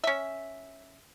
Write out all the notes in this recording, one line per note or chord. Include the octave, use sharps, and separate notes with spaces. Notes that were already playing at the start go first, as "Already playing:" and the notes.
C#4 E5